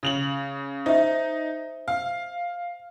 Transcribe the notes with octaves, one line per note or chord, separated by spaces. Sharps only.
C#3 F7 F#7
D#4 C5 E5
F5